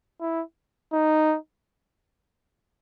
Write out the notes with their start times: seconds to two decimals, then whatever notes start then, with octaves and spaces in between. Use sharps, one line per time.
0.21 E4
0.93 D#4